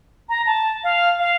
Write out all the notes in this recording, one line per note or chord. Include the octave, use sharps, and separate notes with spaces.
A#5
A5
F5
F5